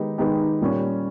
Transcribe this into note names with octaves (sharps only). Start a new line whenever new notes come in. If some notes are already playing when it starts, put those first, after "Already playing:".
Already playing: D#3 G#3 B3 D#4 G4
D#3 G#3 B3 D#4 G4
A#2 G3 C#4